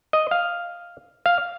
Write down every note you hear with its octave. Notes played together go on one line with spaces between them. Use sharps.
D#5
F5
F5